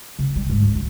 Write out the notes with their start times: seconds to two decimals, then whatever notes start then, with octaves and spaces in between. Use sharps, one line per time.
0.19 C#3
0.36 G3
0.50 G#2
0.63 C#2
0.75 F#3